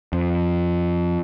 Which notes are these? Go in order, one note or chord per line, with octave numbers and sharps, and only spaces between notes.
F2